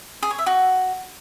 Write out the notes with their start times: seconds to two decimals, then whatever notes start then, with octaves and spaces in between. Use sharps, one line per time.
0.23 G#4
0.31 C#5
0.38 E5
0.46 F#4